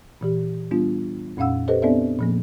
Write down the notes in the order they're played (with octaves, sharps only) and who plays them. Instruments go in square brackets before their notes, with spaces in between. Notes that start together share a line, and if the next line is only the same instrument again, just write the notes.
[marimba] A#2 E3 G4
G3 B3 D4 F4
F2 A#2 C#4 F5 F#5 E6
G4 A4 B4 C5 D#5
B3 C4 D4 A4 D5 E5
A#2 F3 A#3